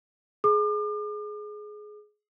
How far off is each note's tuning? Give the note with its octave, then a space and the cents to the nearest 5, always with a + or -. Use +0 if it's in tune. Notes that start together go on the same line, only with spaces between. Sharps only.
G#4 +20 D6 +40